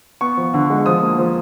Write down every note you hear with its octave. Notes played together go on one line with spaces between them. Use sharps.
B3 C#6
F3
D3
G#3
F3 D#6
A#3
F3